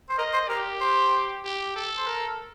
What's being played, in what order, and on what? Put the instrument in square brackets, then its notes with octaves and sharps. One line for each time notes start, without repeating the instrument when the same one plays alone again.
[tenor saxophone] C5
[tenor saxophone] A#4 [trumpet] D#5
[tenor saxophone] C5
[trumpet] G4 [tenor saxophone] A#4
[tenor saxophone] C5
[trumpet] G4
A4
[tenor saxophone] C5
A#4